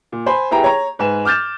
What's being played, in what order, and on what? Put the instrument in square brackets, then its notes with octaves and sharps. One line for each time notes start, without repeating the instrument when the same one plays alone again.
[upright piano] A#2
C5 G#5 B5 C6
B3 E4 G4 G#4 G5 A#5
C#5 A#5
G#2 B4 G#5 E7
D6 F6 G6 A6 E7